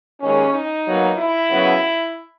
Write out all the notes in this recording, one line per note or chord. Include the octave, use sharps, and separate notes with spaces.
D#2 D#3 G#3 C#4
D#4
B2 F#3 A#3
E4
F#2 C#3 F#3 B3